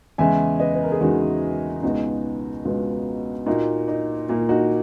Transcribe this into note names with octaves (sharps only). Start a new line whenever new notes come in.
E2 C#3 G#3 E5 G#5
B4 D#5
B4
A#4
G#4
E2 C#3 G#3 D#4 F#4
C#2 B2 G#3 B3 D#4 F#4
C#2 B2 G#3 B3
A#2 A#3 D#4 F#4
D#4
A#2 A#3
D#4 F#4